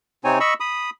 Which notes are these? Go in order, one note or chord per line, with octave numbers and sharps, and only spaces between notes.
C3 C4 D#4 C#5 G#5
D#5 B5 C#6 E6
B5 D#6